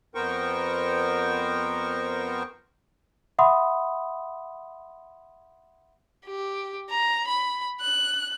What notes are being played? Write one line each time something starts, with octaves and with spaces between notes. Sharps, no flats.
F2 B3 A#4 C5 G5 C#6
E5 F#5 B5 C6 D#6
G4
A#5
B5
F#6